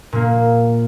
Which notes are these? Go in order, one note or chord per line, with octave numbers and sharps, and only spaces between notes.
A#2 A#3